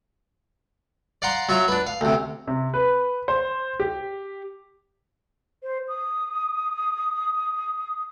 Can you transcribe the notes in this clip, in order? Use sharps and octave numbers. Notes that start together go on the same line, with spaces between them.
D5 F5 F#5 A#5 C6
F#3 F4 E5
D4 B4
F5
D2 C3
C3
B4
C5
G4
C5
D#6